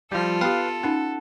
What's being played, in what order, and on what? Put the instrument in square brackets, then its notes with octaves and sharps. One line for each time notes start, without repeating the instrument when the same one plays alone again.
[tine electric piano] F3 G3 [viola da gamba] F4 [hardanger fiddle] A4
[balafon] B3 G4 [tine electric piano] B4 F5
[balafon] C#4 D#4 [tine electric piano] F#5